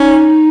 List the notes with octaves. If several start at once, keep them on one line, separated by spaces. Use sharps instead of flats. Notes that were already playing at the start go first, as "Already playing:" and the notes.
Already playing: C#4 D#4